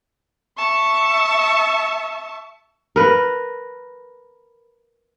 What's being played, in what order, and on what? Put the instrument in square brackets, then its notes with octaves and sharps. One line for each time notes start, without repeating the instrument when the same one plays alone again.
[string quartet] E5 A5 C#6
[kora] A#4 B4